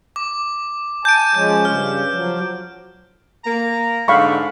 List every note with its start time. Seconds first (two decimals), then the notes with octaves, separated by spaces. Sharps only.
0.16 D6
1.05 G#5 A5 G6 D7
1.35 F3 G#3 C#4 G6
1.65 G2 C#3 F6
2.13 F3 F#3
3.45 A#3 A#5
4.08 G#2 D3 F5 B5 C#6